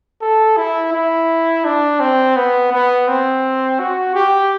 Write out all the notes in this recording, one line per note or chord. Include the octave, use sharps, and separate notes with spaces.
A4
E4
E4
D4
C4
B3
B3
C4
F#4
G4